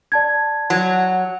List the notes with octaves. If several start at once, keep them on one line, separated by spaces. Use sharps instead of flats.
D5 A5 G#6
F#3